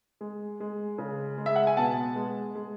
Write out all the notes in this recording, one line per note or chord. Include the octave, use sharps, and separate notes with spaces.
G#3
G#3
C#3
G#3
E5
F#5
G#5
B2 F#5 A5
G#3
G#3